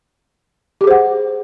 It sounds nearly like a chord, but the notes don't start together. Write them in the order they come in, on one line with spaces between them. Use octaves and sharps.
G4 G#4 C5 F#5